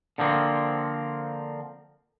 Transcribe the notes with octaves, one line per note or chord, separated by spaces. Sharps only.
D3 F3 A#3 C4